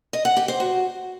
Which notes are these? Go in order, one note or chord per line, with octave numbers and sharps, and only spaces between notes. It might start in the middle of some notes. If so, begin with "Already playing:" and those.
D#5
F#5
G4
C5
F#4